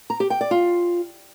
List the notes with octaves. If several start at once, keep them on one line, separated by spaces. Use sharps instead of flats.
A#5
G4
G5
D5
F4